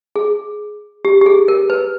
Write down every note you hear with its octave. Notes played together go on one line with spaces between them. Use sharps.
G#4
G4
G4
G#4
A#4
B4